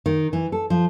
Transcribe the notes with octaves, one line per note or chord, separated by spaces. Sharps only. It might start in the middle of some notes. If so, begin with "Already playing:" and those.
D#3
E3
A4
F3